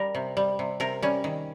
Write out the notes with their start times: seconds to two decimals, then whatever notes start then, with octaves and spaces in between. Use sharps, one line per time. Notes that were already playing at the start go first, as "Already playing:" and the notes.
Already playing: G3 A#4
0.15 C3
0.37 G3
0.59 C3
0.80 C3 A#4
1.02 G3 C#4
1.24 D#3